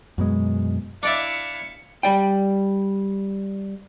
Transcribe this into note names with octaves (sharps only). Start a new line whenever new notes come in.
F#2 B2 G#3
D4 E4 D5 E5 F5 C#7
G3 D5 G5